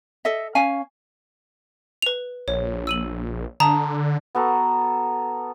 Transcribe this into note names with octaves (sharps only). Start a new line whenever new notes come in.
A4 D#5 E5
C#4 F5 G#5
B4 F7
A#1 C#5
E6 D#7 F#7
D3 A5 A#5 D#6
B3 F#4 A4 A#5